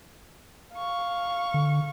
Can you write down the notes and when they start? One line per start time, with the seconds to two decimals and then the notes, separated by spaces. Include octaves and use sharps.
0.74 F5 C#6
1.54 D3